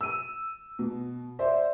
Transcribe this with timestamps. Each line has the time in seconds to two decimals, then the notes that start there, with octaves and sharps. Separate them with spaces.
0.01 E6 D#7
0.79 B2
1.39 C5 D5 E5